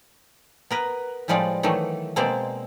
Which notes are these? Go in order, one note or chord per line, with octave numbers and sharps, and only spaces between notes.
B3 A#4 B4
A2 F3 G3 G#3 F4 D5
D#3 E3 F#3 A3
B2 G#3 A#3 C4 C5 D5